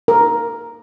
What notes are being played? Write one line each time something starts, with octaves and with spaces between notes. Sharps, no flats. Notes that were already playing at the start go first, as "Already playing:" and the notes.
A#4